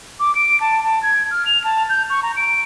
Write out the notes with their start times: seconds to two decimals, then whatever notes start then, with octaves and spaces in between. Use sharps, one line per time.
0.20 D6
0.35 D7
0.61 A5
0.83 A5
1.03 G#6
1.31 F6
1.46 F7
1.64 A5
1.89 G6
2.10 C#6
2.23 A#5
2.36 D7